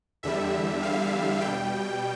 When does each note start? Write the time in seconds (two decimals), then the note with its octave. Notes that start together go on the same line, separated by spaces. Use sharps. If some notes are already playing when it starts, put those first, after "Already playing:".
0.23 E2 D3 G3 E5
0.83 F5
1.41 B2 G3 G5